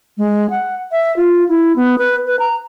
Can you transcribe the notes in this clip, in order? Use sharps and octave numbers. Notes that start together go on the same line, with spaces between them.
G#3
F#5
E5
F4
E4
B3
B4
B4
A#5